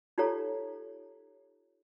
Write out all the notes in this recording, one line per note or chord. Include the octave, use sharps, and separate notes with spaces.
D#4 F4 G4 A4 C#5 A#5